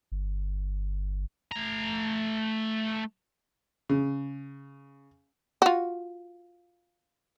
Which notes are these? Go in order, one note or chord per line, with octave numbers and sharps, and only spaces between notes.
G1
A3 A#5
C#3
F4 F#4